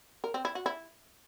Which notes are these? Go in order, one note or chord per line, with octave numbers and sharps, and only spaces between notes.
A#4
C4
E4
F#4
E4